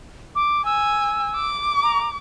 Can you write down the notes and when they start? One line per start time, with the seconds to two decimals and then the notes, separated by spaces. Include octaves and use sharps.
0.35 D6
0.65 G#5 E6
1.36 D6
1.83 A#5